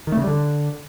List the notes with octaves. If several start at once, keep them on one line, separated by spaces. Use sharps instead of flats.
D#3
A3
C#3
G3
D3